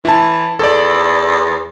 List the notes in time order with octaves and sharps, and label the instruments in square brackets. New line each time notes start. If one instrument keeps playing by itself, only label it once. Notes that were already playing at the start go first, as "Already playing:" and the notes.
[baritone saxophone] E3 [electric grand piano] E4 A5
[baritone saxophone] E2 [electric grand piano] A4 D5